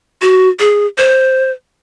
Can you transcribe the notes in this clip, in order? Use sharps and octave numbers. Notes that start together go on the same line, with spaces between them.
F#4
G#4
C5